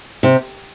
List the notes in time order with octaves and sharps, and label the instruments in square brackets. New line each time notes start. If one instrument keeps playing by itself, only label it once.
[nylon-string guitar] C3